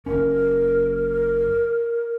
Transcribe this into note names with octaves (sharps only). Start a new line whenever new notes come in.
F#1 C#4 A#4